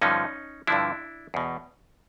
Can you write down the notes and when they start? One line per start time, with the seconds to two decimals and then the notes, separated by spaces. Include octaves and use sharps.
0.02 G2 D3 F3 C#4 D#4
0.67 G2 D3 F3 D4 E4
1.34 E2 B2